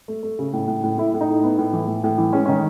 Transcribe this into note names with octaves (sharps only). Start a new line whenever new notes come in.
A3
A3
C#3
A2
A2
A2
A2 E4
A2
D#4
A3
B3
A2
E3
A2
A2
E3
G#3 C#4
D#3 C#4